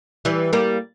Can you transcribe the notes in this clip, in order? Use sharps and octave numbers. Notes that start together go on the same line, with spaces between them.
E3 G3
G3 A#3